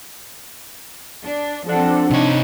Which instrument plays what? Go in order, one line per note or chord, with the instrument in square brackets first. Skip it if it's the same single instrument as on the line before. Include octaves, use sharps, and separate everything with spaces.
[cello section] D4
[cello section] F3 C4 [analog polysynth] D4 [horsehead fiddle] A4 F#5
[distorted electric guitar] C3 C#5 [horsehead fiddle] D#4